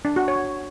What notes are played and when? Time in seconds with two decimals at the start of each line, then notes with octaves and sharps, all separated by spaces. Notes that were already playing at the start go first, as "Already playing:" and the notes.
0.05 D4
0.16 F#4
0.28 C#5